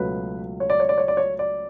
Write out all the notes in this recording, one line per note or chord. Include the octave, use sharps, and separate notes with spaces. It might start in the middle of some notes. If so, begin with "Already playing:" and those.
Already playing: C#2 B2 F#3 A3 B4
C#5
D5
C#5
D5
C#5
D5
C#5
D5